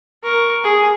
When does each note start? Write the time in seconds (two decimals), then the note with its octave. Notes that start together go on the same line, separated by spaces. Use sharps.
0.23 A#4 C#6
0.64 G#4